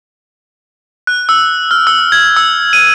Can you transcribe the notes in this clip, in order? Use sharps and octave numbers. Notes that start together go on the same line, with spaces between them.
F#6
E6
F6
E6
G#6
E6
D#7